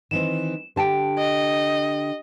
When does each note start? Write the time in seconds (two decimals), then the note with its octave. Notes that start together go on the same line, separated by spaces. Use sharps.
0.11 D#3 E3 C4 E7
0.76 D3 G4 G5 A5 D7
1.18 D#5